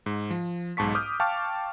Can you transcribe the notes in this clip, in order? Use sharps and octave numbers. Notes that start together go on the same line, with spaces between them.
G#2
F3
B1 G#2 A5 C#6 B6
D6 D#6 F6 G6
F5 G5 A5 C#6 D6 F6